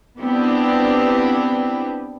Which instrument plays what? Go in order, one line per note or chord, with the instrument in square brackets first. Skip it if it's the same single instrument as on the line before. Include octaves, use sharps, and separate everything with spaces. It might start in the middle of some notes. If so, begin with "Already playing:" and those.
[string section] B3 C4 D4 E4 G4